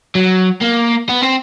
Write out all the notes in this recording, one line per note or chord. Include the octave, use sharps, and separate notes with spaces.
F#3
A#3
B3
C4